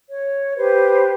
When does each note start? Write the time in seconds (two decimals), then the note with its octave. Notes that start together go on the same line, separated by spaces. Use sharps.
0.10 C#5
0.56 G4 B4 C5